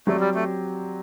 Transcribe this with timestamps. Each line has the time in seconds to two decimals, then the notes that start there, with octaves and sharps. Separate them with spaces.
0.07 F#3 A3 C4 G4 D5
0.20 G3
0.35 A3